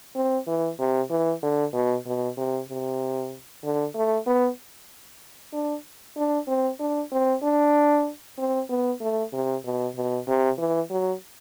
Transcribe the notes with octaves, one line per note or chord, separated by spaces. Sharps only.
C4
E3
C3
E3
D3
B2
B2
C3
C3
D3
A3
B3
D4
D4
C4
D4
C4
D4
C4
B3
A3
C3
B2
B2
C3
E3
F#3